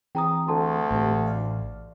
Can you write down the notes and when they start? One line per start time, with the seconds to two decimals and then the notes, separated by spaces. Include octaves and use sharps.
0.15 E3 C4 G#4 G5 A#5 D#6
0.48 D2 A4 A5 C6
0.91 A1 A3 C4 G4
1.26 D5 F5